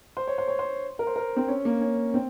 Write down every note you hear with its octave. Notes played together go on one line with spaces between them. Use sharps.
C5
C#5
C5
C#5
C5
A#4
C5
A#4
C4
C#4
A#3
C#4
C4